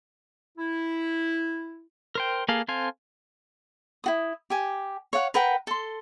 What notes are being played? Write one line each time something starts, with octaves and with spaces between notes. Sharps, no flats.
E4
A#4 C5 G5
A#3 G#4 A4 F5
C4 A4 C5 F5 G#5
E4 F#4 D#6
G4 G#5
C#5 F5 F#5
A#4 B4 F#5 G5
A4 C6